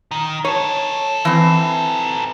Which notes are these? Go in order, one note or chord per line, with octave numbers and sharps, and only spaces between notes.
D#3
D#4 A4 C#5
E3 C4